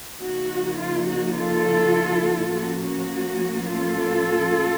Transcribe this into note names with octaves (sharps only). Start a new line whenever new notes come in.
C#3 F3 A#3 D#4 F#4
F4
F#4
F4 A4
A2 F3 A#3 C#4 F#4
F#4
F4 A4